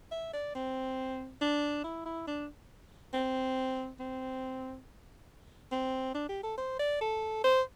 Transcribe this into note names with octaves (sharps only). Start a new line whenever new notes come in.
E5
D5
C4
D4
E4
E4
D4
C4
C4
C4
D4
G4
A4
C5
D5
A4
C5